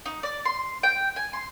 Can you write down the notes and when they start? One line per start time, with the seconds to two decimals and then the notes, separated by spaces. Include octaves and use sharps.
0.06 D#4
0.23 D5
0.45 C6
0.83 G5
1.16 G#5
1.33 C6